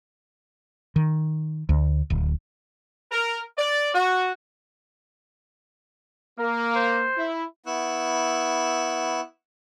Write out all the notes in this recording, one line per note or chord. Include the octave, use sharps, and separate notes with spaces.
D#3
D2
D1
A#4
D5
F#4
A#3 A#4
C5
E4
B3 E4 C#6 E6 F#6